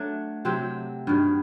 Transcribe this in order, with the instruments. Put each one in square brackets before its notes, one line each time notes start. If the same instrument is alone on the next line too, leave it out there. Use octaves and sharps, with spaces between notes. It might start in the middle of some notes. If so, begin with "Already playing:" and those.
Already playing: [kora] F#3 A3 D4
C3 F#3 C4 G4
G2 D#3 F#3